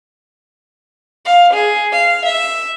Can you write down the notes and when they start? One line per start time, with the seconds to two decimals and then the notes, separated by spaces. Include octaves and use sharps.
1.25 F5
1.54 G#4
1.93 F5
2.26 E5